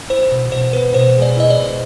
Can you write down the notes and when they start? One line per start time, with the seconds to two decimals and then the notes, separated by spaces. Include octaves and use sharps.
0.10 E4 C5
0.31 B2
0.51 B2 C5
0.73 B3 B4
0.94 B2 C5
1.16 G#3
1.22 D5
1.36 E4 D#5
1.50 D5
1.58 B2